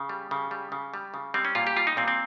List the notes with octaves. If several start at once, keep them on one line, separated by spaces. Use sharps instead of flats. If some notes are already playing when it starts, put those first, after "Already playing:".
Already playing: C#3
G3
C#3
G3
C#3
G3
C#3
G3 C4
C#4
A#2 F4
G4
G3 F4
D#4
A#2 C4
C4